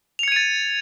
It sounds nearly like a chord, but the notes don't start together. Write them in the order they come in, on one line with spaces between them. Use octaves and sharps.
F7 C#7 G#6 D#7 A6